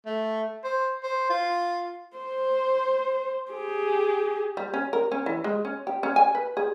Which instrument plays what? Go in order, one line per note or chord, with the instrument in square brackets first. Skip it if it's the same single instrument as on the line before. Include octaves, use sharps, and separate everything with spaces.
[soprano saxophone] A3
C5
C5
F4
[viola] C5
G4 G#4
[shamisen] G3
C#4
A#4
C#4
E3
G#3
C#4
G4
C#4
G#5
B4
G#4